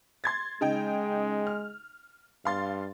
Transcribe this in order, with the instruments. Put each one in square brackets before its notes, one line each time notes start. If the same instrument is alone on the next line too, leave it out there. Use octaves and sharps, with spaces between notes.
[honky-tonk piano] C6 G#6 A6
[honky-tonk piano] C#3 D#4 G5 [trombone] G#3
[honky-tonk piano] F6
[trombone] G2 [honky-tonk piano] F5 C6 A6